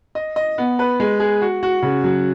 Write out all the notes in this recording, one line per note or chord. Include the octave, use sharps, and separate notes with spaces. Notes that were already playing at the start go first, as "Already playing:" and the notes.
D#5
D#5
B3
B4
G#3
G#4
F#4
F#4
C#3
F#3